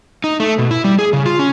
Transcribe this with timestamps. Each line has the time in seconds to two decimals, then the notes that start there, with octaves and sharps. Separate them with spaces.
0.24 D#4
0.40 A3
0.58 B2
0.71 E4
0.84 G3
0.99 G#4
1.13 C#3
1.26 F4
1.39 C#4